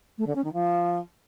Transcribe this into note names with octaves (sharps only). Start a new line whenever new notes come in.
A3
D3
C#4
D#3
F3